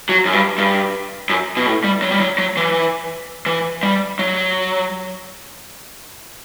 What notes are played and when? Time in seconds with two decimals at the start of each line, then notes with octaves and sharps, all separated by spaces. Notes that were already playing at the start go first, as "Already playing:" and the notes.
0.09 F#3
0.26 F#2
0.33 G2
0.58 G2
1.29 F#2
1.57 B2
1.66 A2
1.84 G3
2.02 F#3
2.12 G3
2.20 F#3
2.38 F#3
2.57 E3
3.46 E3
3.83 G3
4.19 F#3